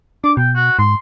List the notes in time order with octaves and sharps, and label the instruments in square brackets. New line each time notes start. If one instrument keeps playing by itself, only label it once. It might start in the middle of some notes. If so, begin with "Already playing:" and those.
[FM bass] D4 [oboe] D6
[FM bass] B2 [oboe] G5
[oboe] F#4
[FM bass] G#2 [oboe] C6